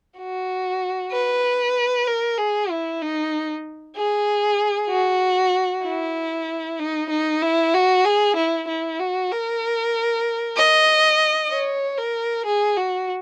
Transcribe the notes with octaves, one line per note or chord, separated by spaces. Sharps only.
F#4
B4
A#4
G#4
E4
D#4
G#4
F#4
E4
D#4
D#4
E4
F#4
G#4
E4
E4
F#4
A#4
D#5
C#5
A#4
G#4
F#4